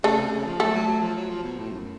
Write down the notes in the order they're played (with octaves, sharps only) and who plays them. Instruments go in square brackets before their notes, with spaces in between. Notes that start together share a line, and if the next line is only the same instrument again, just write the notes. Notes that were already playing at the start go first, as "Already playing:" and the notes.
[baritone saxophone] C#3 [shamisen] A3 A4
[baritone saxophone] C3
C#3
F3
[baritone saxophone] F#3 [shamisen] A3 A4
[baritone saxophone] F#3
F#3
F3
F#3
F3
B2
A2
F#2